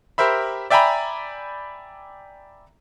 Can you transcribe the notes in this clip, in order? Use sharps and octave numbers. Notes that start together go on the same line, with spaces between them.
G4 A#4 C5 E5 B5
D5 E5 G5 G#5 A#5 B5